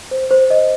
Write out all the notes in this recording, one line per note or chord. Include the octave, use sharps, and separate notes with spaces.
C5
C5
D#5